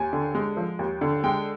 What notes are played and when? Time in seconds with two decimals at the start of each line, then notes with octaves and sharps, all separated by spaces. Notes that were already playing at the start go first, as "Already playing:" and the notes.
Already playing: D#2 G#5
0.13 D3
0.35 G#3
0.57 F3
0.79 D#2
1.01 D3
1.24 G#3 G5